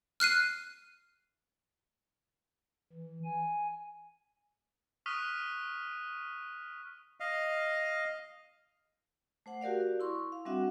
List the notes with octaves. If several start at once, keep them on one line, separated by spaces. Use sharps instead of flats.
F6 F#6 C7 D#7
E3
G#5
C#6 D#6 F6 F#6 B6 D#7
D#5 F5
A3 C5 F#5
F#4 G4 A#4 D5 F5
E4 C6 C#6
F5
G3 C4 D4 F#4 E5 F#5